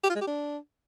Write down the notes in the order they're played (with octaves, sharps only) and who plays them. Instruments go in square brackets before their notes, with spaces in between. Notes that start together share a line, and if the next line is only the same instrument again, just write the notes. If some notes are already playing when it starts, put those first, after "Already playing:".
[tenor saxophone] G4
F4
G#3
G4
D4